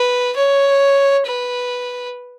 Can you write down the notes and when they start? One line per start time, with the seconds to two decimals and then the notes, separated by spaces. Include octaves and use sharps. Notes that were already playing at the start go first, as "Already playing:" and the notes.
Already playing: B4
0.36 C#5
1.26 B4